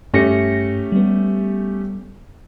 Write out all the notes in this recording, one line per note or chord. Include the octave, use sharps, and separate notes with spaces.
G2 A3 C#4 G4 A#6 C#7
G3 B3